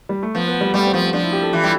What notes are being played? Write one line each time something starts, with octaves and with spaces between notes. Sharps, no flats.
G3
A3
F3 B3
B3
G3
G3 A3
C4
F3
C4
F3 D4
E4
G4
A4
E3 F4
G3